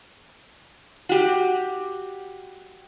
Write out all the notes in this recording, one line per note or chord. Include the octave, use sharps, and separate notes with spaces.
F#4 G4